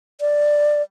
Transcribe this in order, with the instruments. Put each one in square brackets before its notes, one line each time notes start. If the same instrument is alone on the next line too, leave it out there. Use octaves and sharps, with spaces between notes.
[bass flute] D5